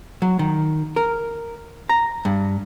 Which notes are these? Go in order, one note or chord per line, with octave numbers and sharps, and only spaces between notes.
F#3
D#3
A#4
A#5
G2